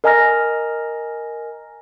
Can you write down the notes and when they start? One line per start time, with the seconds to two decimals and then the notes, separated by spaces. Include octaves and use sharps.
0.04 A#4 D#5 G#5 A#5 F6 A#6